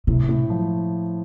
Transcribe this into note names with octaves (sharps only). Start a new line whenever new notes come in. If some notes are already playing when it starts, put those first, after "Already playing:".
A2 C3
A2
F3